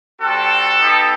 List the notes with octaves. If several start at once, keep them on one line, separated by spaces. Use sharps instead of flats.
G3 C4 F#4 A4
B3 D#4 G4